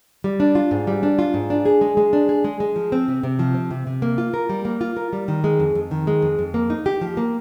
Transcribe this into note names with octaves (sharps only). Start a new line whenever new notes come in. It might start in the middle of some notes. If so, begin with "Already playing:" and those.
G3
D4
F4
G#2
G3
D4
F4
G#2
D4
G#4
G#3
G#3
D4
G#4
G#3
G#3
F3
C4
C3
C3
F3
C4
C3
C3
A#3
F4
A#4
G3
A#3
F4
A#4
G3
D#3
G#3
F2
F2
D#3
G#3
F2
F2
A#3
D#4
G4
F3
A#3